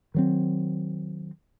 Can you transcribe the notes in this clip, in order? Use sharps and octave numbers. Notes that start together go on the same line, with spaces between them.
D#3 F#3 C4